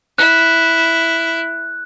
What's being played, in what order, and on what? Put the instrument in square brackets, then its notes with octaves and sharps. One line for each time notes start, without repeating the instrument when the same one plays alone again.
[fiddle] E4 [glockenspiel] F#6